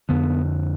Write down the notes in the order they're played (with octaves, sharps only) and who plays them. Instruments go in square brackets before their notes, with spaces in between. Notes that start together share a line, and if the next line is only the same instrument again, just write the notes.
[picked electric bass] F2 D3 B3